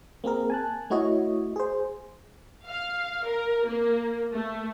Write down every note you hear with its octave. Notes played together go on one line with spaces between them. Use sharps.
A#3 C4 G#4 A#4
G#5 A5 F#6
A3 E4 F#4 C#5 D#5
G#4 C5
F5
A#4
A#3
A3